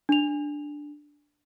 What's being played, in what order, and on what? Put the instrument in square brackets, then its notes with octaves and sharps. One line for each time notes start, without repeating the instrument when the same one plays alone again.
[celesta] D4 F7